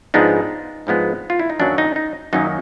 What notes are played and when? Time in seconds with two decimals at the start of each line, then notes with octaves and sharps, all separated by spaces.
0.14 G#2 F3 G#3 B3 D4 D#4
0.87 G#2 F3 G#3 B3 D4
1.30 F4
1.39 E4
1.50 D#4
1.59 F#2 D#3 F#3 A#3 C#4 D4
1.78 D#4
1.96 D#4
2.33 F#2 D#3 F#3 A#3 C#4 D#4